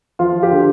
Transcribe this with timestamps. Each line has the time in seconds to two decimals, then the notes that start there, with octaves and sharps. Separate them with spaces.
0.19 F3 F4
0.43 G4
0.50 D3